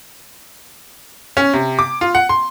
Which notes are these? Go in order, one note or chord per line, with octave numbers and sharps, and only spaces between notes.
C#4
C3
D6
F4
F#5
C6